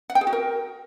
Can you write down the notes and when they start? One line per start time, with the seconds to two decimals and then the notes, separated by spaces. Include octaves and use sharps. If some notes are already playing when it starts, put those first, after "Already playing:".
0.10 F#5
0.15 G5
0.21 G#4
0.27 F#4
0.33 A#4